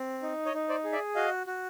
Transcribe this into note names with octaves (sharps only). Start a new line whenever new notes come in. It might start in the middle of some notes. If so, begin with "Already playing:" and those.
Already playing: C4
D#4
C#5 D#5
D#4
C5 D5
G#4
D5 E5
F#4 D#5 F5
F#4